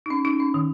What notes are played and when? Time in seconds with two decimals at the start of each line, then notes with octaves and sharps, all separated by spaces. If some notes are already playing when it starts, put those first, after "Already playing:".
0.06 D#4
0.10 C#4
0.25 D#4
0.40 C#4
0.54 D#3